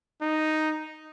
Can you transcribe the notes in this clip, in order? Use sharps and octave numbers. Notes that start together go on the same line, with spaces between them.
D#4